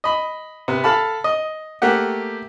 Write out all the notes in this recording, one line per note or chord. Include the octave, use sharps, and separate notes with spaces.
D#5 B5
C3 B3
A4 F5 A5 B5
D#5
A3 A#3 G4 F#5